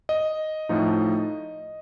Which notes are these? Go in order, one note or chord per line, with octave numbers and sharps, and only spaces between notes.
D#5
A2 F3 A3 D#4